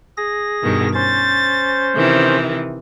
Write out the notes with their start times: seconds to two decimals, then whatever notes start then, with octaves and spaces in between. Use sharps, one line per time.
0.17 G#4 A#6
0.63 G2 B2 D#3
0.95 C#4 C5 A6
1.95 C3 D#3 E3